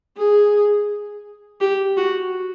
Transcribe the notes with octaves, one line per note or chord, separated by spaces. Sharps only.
G#4
G4
F#4